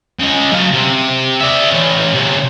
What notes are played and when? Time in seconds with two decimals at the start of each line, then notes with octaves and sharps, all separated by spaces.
0.19 C#3 D#5
0.52 F#3 F5
0.73 C3
1.40 D5 E5
1.70 E3 C#4
2.15 C3 C#4